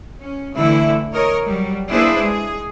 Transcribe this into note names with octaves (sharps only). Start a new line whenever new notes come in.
C#4
D3 E3 A3 E4
A#4 C#5 D#5
F#3 G3
A#3 D4 E4 G#4 B4 C5
G#3 G#4